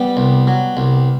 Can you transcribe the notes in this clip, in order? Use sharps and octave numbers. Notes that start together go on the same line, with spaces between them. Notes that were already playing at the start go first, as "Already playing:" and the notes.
Already playing: G3 B3
C2
F#3
C2